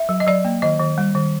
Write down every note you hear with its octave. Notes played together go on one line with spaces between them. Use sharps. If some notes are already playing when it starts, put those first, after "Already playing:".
Already playing: E5
F#3
D#5
F#3 D5
A#3
D#3 D#5
D#3
G3
D#3